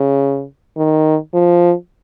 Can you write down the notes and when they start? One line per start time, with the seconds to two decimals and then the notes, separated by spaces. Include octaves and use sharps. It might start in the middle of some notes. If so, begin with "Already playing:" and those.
Already playing: C#3
0.77 D#3
1.34 F3